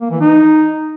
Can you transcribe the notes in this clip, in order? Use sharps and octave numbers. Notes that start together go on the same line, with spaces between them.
A#3
E3
D#4